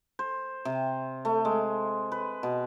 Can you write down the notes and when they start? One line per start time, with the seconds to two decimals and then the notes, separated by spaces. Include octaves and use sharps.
0.19 C5
0.65 C3
1.25 A3
1.45 G#3
2.12 B4
2.43 B2